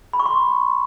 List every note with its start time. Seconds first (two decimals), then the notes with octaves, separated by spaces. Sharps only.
0.13 B5
0.20 C#6
0.26 C6